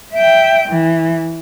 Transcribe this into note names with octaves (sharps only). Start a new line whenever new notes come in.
E5 G5
E3